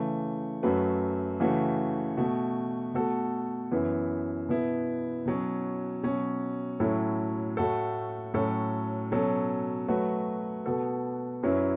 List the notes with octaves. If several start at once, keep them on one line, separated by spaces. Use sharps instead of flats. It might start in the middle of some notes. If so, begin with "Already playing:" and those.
Already playing: C#3 E3 A3
F#2 F#3 A3 F#4 B4
C#3 E3 A3 F#4
B2 A3 F#4
B2 A3 F#4 A4
F#2 E3 B3 E4
B2 B3 E4
B2 F#3 C#4
B2 F#3 C#4
A2 F#3 C#4 E4 A4
A2 A3 F#4 A4
A2 F#3 C#4 A4
B2 F#3 C#4 A4
F#3 A3 F#4 B4
B2 B3 F#4 A4
F#2 F#3 C#4 E4 B4